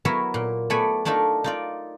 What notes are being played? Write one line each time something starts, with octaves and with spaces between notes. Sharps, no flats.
F#3 B3 E4 A#4 C#5 E5
A#2
A3 B3 D5 F#5 G#5 B5
A3 D4 D#4 F4 A#4
D#4 F4 D5